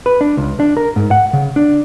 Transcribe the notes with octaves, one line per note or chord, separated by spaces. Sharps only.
B4
D4
C#2
D4
A#4
G#2
F#5
C#3
D4